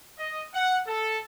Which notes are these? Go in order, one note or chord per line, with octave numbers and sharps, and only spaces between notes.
D#5
F#5
A4